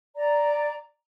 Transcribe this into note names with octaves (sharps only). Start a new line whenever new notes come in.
D5 A#5